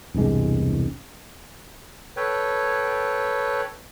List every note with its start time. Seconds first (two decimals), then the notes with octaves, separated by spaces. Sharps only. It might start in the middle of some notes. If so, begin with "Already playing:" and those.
0.14 E1 C2 G2 G#3
2.17 A4 B4 C#5 G5